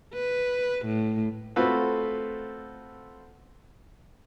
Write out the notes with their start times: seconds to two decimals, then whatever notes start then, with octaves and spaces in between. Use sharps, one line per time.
0.14 B4
0.86 A2
1.56 A3 C4 F4 F#4 A4 B4